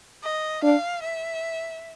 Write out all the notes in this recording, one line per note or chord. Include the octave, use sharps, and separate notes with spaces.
D#5
D4 F5
E5